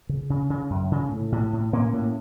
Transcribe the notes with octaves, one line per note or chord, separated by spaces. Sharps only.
C#3
C#3
C#3
F#2
C#3
A2
A2
A2
A2 A#3 C#4
A2